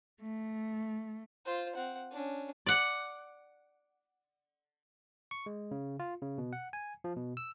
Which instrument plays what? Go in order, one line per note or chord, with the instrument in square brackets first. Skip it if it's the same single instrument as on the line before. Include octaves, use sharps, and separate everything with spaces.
[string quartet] A3
[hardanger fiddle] F4 C5
C4 F#5
C#4 D4
[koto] D5 F#5
[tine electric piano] C#6
G#3
C#3
F4
C#3
B2
F#5
G#5
F3
B2
E6